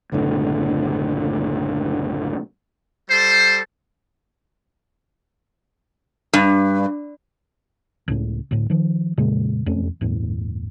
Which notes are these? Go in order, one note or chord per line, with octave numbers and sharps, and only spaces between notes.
F#1 B1 A2 D3
G3 A4 C5
G2
C#2 A2 C#3
D2 A2
D#3 F3
F2 A#2 C#3 G#3
E1 F2 A3 C#4
G1 E2 A2